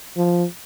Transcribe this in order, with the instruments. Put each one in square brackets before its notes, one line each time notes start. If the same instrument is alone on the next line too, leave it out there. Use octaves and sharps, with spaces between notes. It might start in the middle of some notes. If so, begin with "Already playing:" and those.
[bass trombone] F3